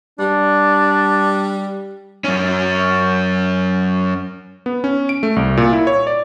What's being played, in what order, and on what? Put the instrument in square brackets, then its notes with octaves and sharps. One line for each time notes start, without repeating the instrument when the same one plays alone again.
[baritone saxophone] G3 [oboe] D4
[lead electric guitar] F#2 C#4
[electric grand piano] B3
C#4
D7
A3
C2
A#2
E4
C#5
D5